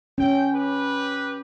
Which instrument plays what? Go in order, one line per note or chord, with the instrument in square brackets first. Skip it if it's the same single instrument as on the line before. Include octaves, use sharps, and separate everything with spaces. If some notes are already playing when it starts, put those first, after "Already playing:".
[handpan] C#4 [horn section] G5
[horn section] G4 B4